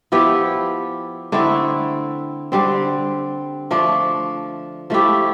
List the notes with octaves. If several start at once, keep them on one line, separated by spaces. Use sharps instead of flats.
F3 B3 E4 G4
D3 A3 C4 E4
D3 G3 C4
F3 A3 D4
F3 A3 E4 G4